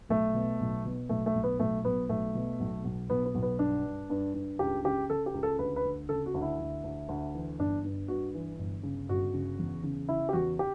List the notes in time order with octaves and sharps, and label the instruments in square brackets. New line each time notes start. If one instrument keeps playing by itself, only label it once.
[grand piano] B1 A3
B2
B1
B2
B1 A3
A3
B1
B3
B1 A3
B1 B3
B1 A3
B2
B1
B1
B1 B3
B3
B1
B3
G2 D4
G2
G2
G2
C#2 G4
C#3 G4
C#3 A4
G4
C#2
A4
D2 B4
B4
D2
C#3 A4
F#4
D2
E4
D2
D2
D2
E3
G1 D4
G2
G2 F#4
E3
G1
C#3
G1 F#4
C#3
E2
C#3
C#3 E4
G4
E2 F#4
G4